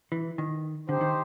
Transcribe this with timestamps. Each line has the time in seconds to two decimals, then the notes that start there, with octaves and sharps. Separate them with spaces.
0.12 E3
0.38 D#3
0.88 D3 D#4 G4 C5
1.01 D#3